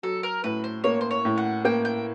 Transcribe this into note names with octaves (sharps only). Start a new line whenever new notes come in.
F#3 A4
A#4
A2 B4
C5
A#3 C#5
C5
C#5
A2
F#5
A#3 G5
G5